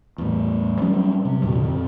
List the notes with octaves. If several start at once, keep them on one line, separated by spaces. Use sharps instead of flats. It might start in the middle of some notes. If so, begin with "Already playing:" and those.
E2 A2
F#3 G3 C#4
C3
E2 A#2 D3
F2